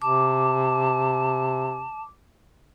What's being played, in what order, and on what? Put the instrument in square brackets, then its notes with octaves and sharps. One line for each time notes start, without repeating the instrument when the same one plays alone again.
[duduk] C3 [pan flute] A5 [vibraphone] D6